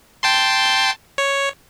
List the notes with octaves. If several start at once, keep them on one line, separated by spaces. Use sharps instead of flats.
G5 A5 C6
C#5